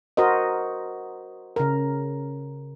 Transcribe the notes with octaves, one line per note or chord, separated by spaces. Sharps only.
F#4 A#4 C5 D#5
C#3 A#4